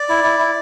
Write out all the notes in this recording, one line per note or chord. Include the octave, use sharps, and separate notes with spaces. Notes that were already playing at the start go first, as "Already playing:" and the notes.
Already playing: D5
E4
E4
E4